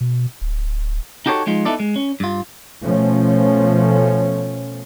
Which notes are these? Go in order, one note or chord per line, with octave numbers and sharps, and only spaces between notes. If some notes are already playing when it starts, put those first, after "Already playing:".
B2
D1
D#4 F#4 G4 A4 C5 C#5
F3 G#3 D#4 F4
B3 D#4 E4 A4 D5
G#3
C#4
G2 F4
B2 F3 A3 C#4